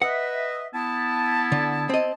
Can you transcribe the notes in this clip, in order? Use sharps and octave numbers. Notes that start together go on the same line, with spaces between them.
B4 D#5 E5 F#5
B3 E4 A5
D3
C4 D#5